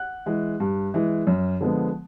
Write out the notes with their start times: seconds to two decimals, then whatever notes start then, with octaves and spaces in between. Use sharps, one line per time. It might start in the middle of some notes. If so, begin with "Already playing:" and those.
Already playing: F#5 F#6
0.26 E3 G#3
0.60 G2
0.94 E3 G#3
1.27 F#2
1.61 D3 F3 G#3 B3